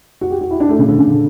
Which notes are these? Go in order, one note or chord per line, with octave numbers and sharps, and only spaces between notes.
F#4
G4
F#4
E4
D4
A3
C#3
D3
C#3
D3